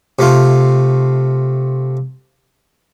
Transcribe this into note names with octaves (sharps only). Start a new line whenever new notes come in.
C3 A3 F4